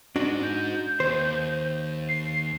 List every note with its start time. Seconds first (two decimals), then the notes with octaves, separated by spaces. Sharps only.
0.16 G#3 D4 D#4 F#4
0.43 G6
1.00 D#2 C5
2.09 C7